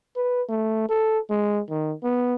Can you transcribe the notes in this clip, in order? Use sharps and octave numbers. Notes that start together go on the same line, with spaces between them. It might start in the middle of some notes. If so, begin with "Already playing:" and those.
B4
A3
A4
G#3
D#3
B3